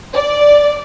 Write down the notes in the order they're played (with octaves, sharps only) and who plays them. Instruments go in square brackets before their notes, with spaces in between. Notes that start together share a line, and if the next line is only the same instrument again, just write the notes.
[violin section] D5